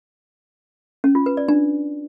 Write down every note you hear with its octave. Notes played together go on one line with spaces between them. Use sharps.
C#4
F4
B4
D5
D4